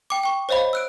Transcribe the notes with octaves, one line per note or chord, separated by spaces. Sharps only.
G5 D6
G5 C#6
C5 C#5 D#5 F5 B5
E6 F#6 D7